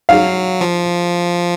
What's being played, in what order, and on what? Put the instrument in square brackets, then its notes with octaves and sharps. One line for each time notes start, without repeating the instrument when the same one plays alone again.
[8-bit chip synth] F#3 [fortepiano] F5
[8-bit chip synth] F3